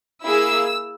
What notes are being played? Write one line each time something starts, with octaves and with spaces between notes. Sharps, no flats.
A#3 E4 G#4 E6